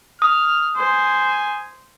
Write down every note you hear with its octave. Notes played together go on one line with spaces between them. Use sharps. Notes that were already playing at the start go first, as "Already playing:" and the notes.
D#6 F6
C5 G#5